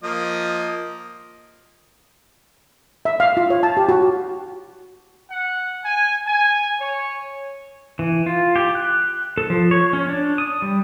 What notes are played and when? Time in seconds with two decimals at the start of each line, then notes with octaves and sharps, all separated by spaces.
0.03 F3 A#3 D#5
3.05 E5
3.20 F5
3.37 F4
3.50 C#5
3.63 A5
3.77 G4
3.89 F#4
5.30 F#5
5.85 G#5
6.27 G#5
6.80 C#5
7.99 E3
8.26 F4
8.56 G4
8.75 F#6
9.38 A4
9.50 F3
9.71 C#5
9.93 C#4
10.09 D4
10.38 D#6
10.62 G3